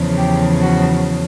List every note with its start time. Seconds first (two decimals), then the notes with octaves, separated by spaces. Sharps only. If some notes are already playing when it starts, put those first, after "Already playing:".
Already playing: E2 C#3 F3
0.17 G4
0.61 F#4